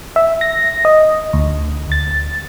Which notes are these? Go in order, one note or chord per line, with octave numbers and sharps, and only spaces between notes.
E5
A#6
D#5
D2
A6